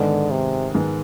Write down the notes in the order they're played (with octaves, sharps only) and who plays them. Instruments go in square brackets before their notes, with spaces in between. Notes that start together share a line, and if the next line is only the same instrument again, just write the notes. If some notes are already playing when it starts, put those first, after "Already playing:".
Already playing: [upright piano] G#2 D#3 G#3 B3 [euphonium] D3
[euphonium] C3
[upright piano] G#2 D#3 G#3 B3